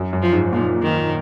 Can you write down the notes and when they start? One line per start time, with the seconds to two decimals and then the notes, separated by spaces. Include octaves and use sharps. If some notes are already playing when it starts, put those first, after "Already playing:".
Already playing: F#2
0.13 F#2
0.22 F3
0.33 G#2
0.53 A#2 F3
0.83 D#3